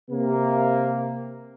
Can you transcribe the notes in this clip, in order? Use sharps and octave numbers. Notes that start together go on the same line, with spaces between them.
C3 A#3